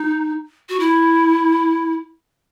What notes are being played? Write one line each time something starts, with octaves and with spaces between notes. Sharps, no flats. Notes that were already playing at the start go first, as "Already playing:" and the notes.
Already playing: D#4
F#4
E4